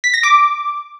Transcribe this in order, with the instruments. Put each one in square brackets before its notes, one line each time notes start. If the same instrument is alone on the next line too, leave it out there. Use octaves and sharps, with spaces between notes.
[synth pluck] B6
A#6
D6